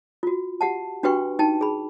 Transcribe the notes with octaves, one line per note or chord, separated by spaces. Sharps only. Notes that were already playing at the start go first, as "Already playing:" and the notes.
F4 F#4
G4 F#5 A5
D4 F#4 G4 B4 G5 C#6
D#4 G5 A5
G#4 B5